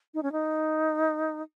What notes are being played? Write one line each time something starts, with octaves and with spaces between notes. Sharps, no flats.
D#4
C#4
D#4